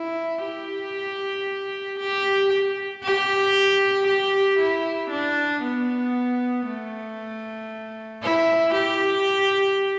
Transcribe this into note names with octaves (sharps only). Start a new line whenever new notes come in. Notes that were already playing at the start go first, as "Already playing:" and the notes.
Already playing: E4
G4
G4
G4
G4
E4
D4
B3
A3
E4
G4